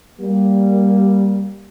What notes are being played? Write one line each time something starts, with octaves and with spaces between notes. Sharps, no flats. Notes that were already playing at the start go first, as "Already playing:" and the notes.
G3 A#3